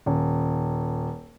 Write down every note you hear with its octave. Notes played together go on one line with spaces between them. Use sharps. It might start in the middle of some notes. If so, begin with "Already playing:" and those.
D#1